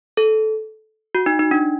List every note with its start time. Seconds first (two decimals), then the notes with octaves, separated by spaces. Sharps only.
0.17 A4
1.15 F#4
1.26 D#4
1.39 D#4
1.51 D4